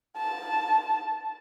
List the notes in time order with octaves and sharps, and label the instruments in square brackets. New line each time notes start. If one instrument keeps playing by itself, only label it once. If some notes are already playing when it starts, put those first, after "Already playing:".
[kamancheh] A5